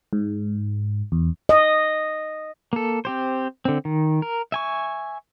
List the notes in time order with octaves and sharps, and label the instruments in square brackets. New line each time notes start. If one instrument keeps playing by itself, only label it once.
[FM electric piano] G#2
E2
[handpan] D#5
[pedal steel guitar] A#3 A4
C4 G4 C5
D3 C4
D#3
A#4
E5 G#5 C#6